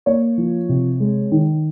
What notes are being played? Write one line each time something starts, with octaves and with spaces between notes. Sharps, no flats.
A#3 C#5
F3
C3
G#3
D#3